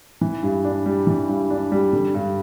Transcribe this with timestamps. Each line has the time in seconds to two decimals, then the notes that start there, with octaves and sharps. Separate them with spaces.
0.21 E3
0.43 G2
0.64 D4
0.86 G3
1.07 E3
1.28 G2
1.50 D4
1.72 G3
1.93 D3
2.15 G2